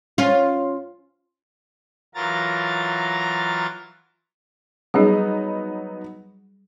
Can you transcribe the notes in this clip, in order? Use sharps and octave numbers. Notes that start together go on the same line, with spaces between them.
C#4 F4
E3 F#3 F4 A#4 A#5 A6
F#3 G3 B3 D#4 G#4